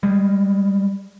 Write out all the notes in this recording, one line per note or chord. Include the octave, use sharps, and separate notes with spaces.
G3 G#3